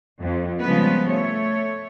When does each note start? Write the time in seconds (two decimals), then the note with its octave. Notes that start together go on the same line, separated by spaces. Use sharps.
0.22 F2
0.62 C#3 F3 G3 G#3 B3 B4
1.09 A3 C#5